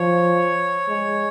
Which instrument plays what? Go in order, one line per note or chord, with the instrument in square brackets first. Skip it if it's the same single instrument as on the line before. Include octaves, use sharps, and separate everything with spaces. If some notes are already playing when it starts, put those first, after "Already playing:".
Already playing: [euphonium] F3 [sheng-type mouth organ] C#5
[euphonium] G#3